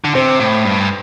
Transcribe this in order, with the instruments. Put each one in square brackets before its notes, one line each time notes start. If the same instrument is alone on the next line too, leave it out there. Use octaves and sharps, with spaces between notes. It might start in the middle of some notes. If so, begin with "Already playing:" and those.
[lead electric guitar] D3
[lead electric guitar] C3 [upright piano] C5
[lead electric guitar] A2
G2